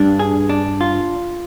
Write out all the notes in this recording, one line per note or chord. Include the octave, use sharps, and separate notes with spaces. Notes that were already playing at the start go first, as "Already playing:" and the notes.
Already playing: G2 D4
G#4
D4
F4